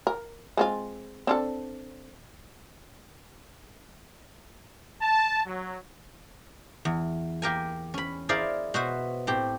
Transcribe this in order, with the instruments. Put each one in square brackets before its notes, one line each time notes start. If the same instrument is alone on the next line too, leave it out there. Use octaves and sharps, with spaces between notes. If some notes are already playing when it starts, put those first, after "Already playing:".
[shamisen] A#4
G#3 C4 F4
C4 D4 A4
[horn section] A5
F#3
[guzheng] E2
A#3 G4 A#4 G#5
C#4 B5
E4 G#4 A#4 C5 D5 F5
B2 F#4 B4 C5 E5
A2 C4 G4